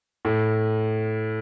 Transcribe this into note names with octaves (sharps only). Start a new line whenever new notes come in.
A2